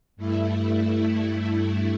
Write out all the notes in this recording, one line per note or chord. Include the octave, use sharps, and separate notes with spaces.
G2 A3 E4